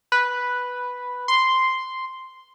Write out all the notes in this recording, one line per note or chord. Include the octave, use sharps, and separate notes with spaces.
B4
C6